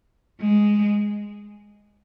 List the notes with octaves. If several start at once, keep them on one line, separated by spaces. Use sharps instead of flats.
G#3